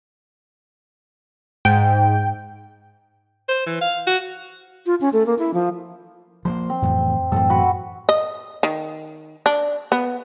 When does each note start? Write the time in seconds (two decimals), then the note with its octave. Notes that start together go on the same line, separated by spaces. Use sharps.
1.65 G#2 G5
3.48 C5
3.66 E3
3.81 F5
4.07 F#4
4.86 F4
5.01 C#4
5.13 A3
5.26 A#3
5.39 E4
5.54 F3
6.45 F3 G#3 A#3 C5
6.70 C4
6.82 F2 A2 E3
7.32 F#2 A2 E3 C4 A4
7.50 F#4 B4
8.09 D#5
8.63 D#3
9.46 D4
9.92 B3